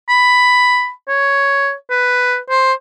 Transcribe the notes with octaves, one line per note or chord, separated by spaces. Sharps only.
B5
C#5
B4
C5